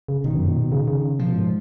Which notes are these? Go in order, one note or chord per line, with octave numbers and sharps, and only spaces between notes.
C#3
B2 D#3
F#2
A#2
B2
C#3
C#3
B2 F3
G#2